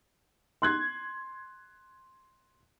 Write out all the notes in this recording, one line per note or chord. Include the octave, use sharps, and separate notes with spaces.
C6 F#6 G#6